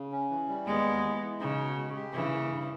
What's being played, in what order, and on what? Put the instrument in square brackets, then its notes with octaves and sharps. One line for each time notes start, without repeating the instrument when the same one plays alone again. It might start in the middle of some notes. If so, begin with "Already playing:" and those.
Already playing: [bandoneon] C#3
C#4
E3
G3
[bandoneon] D#2 [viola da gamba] G#3 B3
[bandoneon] D#2
E3
E3
[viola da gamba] C#3 [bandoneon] D#4
[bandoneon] B2
G#3
G4
[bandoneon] G2 [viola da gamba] C#3 E3
[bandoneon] A#3
G2